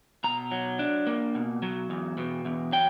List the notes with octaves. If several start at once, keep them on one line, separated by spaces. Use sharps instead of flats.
B2 A#5
F#3
D4
A#3
B2
F#3
E2
B2
E2
F#3 G5